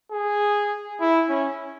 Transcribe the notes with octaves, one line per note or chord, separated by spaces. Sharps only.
G#4
E4
C#4